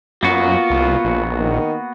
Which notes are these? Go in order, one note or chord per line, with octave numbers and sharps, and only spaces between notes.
F#2 A#3 B3 F4 F#4
C2
A#1
D#3